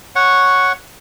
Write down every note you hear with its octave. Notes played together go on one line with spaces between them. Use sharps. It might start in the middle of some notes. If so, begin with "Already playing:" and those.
C#5 F#5 C#6